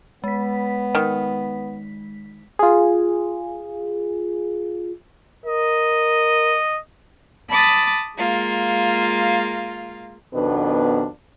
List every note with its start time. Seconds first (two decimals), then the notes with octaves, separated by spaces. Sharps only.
0.24 G#3 B3 B6
0.95 D#3
2.59 F4 G#4
5.46 A#4 D#5
7.49 A5 B5 D6 D#6 A6
8.17 G#3 A#3 F4
10.34 F2 B2 D#3 B3 D4